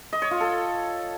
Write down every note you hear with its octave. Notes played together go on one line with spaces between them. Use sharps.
D#5
C#5
F4
A4